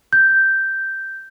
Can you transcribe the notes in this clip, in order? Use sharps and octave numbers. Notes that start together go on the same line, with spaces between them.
G6